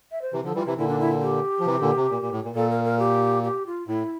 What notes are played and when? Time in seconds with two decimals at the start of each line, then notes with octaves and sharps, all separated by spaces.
0.12 E5
0.22 C5
0.33 C3 E3
0.44 D3 F3 A4
0.55 E3 G3 F4
0.66 C3 E3 E4
0.78 A#2 D3 E4
0.88 D4
1.00 E4
1.22 G4
1.59 F3
1.66 C3 E3
1.81 A#2 D3
1.97 C3
2.11 A#2
2.22 A#2
2.32 A2
2.44 A#2
2.55 A#2 A4
2.70 A#4
2.84 A#4
2.99 G4
3.44 G4
3.66 F4
3.87 A2 E4